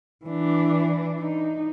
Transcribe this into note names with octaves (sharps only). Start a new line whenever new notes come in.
E3 D4
D#4